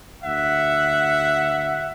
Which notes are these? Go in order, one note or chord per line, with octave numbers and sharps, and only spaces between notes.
D2 E5 F#5